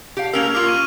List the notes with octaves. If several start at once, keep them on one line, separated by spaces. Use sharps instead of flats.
G4 F5
A#3 C#4 A#4 E6 F6 F7
A#3 F4 D6 F6
C#6 D#7